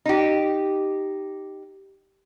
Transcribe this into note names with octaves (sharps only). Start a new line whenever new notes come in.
D#4 G4